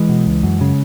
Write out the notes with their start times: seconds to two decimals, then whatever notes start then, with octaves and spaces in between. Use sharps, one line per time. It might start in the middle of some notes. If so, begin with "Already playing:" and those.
Already playing: E3 G#3
0.09 B2
0.27 C#2
0.43 F#2
0.61 C#3